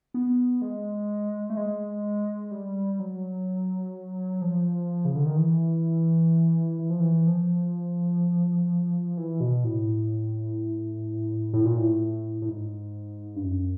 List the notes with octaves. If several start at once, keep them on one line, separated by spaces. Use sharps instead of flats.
B3
G#3
A3
G#3
G3
F#3
F3
C#3
D3
D#3
E3
E3
F3
E3
F3
E3
B2
A2
A2
A#2
A2
A2
G#2
G2
F#2